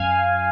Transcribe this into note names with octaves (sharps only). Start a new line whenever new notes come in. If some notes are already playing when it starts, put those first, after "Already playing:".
Already playing: F#2 F5 G#5